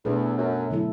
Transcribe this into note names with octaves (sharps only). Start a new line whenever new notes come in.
E2 B2 A3 D4 A4
F#2
D3 F#3 A3 E4 A4